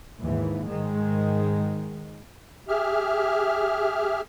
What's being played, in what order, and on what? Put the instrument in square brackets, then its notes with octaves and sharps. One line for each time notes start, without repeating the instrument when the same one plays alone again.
[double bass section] D#2 G#2 E3
G#2 D#3 G#3
[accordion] G4 G#4 E5 F6